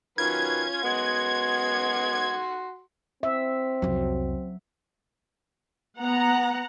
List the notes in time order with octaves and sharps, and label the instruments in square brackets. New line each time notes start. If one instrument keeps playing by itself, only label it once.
[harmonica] D#3 F#3 B4 [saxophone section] C#4 F4 [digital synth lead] G#6
[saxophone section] F#2 G#3 B3 [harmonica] F#4 F#5 C6
[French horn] C4 [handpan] E5
[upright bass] C2 F2 [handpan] F#3
[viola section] B3 F#5 A#5